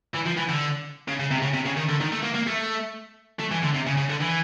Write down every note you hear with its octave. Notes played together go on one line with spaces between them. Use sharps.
E3
F3
E3
D3
C#3
C#3
C3
C#3
C3
C#3
D#3
D3
D#3
A3
A#3
A#3
A3
A3
E3
D3
C3
C#3
C#3
D3
E3